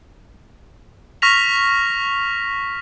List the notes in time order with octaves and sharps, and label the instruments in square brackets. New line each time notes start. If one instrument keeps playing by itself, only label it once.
[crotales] C#6 F6 A#6 B6 F7